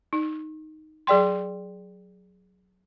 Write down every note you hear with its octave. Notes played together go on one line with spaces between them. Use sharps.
D#4
F#3 G#4 D5 G5 C6